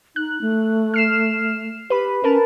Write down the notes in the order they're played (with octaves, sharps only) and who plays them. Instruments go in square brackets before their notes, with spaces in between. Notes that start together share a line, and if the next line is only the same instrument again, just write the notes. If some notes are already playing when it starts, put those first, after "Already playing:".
[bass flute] D#4 [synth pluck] F#6
[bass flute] A3
[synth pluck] F6 C7 E7
[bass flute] G4 [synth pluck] B4 B5
[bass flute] C#4 [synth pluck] A#4 B4 A5